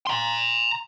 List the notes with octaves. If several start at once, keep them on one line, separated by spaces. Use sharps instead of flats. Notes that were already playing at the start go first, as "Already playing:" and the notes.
A#5 C6